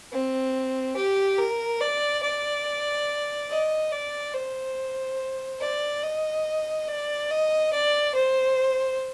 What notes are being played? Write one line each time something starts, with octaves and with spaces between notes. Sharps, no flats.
C4
G4
A#4
D5
D5
D#5
D5
C5
D5
D#5
D5
D#5
D5
C5